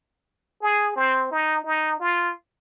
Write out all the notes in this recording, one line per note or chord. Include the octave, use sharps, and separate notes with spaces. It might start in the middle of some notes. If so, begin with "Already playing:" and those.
G#4
C4
D#4
D#4
F4